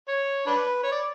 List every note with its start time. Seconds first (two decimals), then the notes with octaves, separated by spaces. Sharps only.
0.08 C#5
0.47 D4 B4
0.83 C#5
0.92 D5